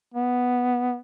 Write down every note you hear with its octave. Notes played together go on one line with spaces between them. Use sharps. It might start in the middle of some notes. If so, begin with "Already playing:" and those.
B3